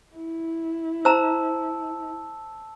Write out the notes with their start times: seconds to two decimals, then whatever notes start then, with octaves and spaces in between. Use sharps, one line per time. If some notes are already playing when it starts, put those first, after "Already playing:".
0.15 E4
1.05 C5 A5 A#5 E6